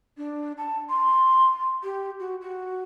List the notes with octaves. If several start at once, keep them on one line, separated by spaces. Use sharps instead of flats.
D4
A5
C6
G4
F#4
F#4